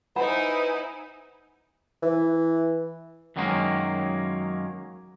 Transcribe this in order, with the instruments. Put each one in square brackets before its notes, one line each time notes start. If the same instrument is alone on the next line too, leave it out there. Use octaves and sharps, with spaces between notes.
[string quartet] D#4 E4 G#5 [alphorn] B4 [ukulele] C5 F#5 B5
[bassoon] E3
[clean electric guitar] F#2 D#3 F#3 G#3 A#3 C#4